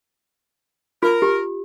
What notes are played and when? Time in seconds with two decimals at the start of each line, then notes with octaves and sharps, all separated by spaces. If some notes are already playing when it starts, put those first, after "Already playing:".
1.03 F4 A#4
1.22 G4